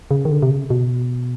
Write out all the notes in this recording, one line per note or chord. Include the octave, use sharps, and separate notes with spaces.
C#3
D#3
D3
C3
C#3
B2